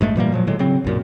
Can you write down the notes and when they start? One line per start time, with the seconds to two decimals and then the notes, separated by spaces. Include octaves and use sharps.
0.01 A1 G2 G#3 A3
0.16 A#2 E3 G3 A#3
0.32 A#2 F3 F#3
0.47 A2 D3 F#3 G#3
0.59 C#3 F#3 C4
0.84 B1 F#2 A#2